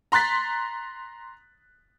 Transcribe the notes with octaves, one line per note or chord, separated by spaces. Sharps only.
A#5 C6 F#6 A6 B6